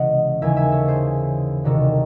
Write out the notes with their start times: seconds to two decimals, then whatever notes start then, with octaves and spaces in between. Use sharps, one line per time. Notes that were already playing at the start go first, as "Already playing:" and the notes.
Already playing: C#2 C3 E3 D#5 F#5
0.42 D#2 C#3 E3 E5 G#5
0.56 E5 G#5
0.72 A4 C#5
0.88 G#4 C5
1.64 C2 C3 D#3 F#4 A4